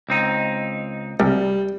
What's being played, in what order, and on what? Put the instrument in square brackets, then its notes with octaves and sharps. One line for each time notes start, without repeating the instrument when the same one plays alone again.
[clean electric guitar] C#2 C4 D#4
[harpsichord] C2 [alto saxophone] G3